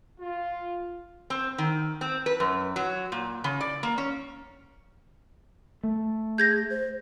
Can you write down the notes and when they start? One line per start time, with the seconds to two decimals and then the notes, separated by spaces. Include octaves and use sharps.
0.20 F4
1.30 C4
1.58 D#3
2.01 C4
2.26 B4
2.40 F#2
2.76 F#3
3.12 A#2
3.44 C#3
3.61 D5
3.83 A#3
3.98 C#4
5.84 A3
6.38 G#4 G6 G#6 A#6
6.70 C5